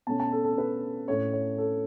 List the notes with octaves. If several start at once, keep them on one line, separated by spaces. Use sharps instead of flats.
B2 A3 C#4 A5
A5
A4
A4
B4
A2 A3 C#4 C#5
C#5
A4